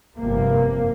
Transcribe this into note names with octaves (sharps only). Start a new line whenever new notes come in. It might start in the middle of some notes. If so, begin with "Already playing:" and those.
G1 F2 C3 A#3